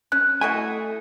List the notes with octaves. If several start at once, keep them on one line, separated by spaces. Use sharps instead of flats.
C#4 F#6
A3 E4 F#4 D#5 G#5